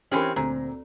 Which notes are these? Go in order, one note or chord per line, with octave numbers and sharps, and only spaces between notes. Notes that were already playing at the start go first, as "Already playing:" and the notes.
E3 C4 C#4 G4 A#4
D2 A#2 C4 A#5